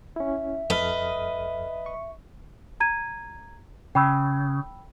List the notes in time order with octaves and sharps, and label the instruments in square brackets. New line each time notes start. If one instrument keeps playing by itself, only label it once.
[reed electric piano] C#4 E4 [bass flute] E5
[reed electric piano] F2 A4 F6 [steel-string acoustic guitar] B4 D#5
[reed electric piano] C#6
[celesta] A#5 G#6 D#7
[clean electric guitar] C#3 [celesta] G5 B5 E6